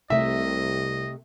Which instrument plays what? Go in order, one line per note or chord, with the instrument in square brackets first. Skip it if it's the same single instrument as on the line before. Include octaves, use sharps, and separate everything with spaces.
[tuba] C2 [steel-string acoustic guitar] C3 A3 [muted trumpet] D#5 [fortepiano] E5